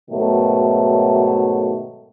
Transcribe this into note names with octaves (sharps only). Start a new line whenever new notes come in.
G#2 B2 D#3 F#3 A3